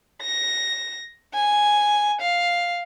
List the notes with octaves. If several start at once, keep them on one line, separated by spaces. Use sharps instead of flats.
A#6
G#5
F5